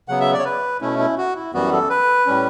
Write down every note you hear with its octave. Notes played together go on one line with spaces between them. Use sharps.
C#3 F#3 B3 F#5
E5
D5
C#5
B4
B2 A3 C#4 E4
E4
F#4
E4
F#2 E3 G3 B3 F#4
A4
B4
A2 G3 C#4